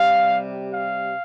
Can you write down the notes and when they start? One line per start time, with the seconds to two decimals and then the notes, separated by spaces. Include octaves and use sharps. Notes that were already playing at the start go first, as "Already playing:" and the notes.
Already playing: C3 G3 F5
0.74 F5